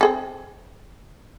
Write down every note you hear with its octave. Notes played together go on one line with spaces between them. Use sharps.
C4 G#4 A4